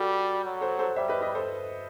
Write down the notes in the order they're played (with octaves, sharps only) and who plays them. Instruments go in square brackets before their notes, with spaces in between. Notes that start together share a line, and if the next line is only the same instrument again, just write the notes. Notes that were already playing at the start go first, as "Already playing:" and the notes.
Already playing: [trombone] G3 [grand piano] F#4 A4
[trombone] F#3
[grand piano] A4 C5
A4 C5
[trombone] G3 [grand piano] C5 E5
[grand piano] B4 D#5
B4 D#5
A4 C5